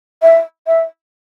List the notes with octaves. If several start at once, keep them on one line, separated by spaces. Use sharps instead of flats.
E5
E5